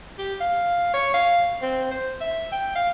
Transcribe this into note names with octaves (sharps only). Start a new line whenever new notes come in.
G4
F5
C#5
F5
C4
C5
E5
G5
F5